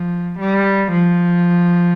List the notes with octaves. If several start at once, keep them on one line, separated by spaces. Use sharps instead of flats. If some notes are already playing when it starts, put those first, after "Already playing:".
Already playing: F3
G3
F3